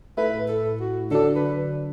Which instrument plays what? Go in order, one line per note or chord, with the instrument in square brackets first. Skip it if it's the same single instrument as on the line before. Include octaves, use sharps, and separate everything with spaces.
[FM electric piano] A2 A3 E4 [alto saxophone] B4
[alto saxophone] A4
F#4
[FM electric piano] D3 F#3 D4 [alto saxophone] A4
[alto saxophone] B4